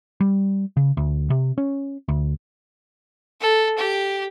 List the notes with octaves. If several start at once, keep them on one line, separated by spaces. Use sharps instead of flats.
G3
C#3
D2
C3
C#4
D2
A4
G4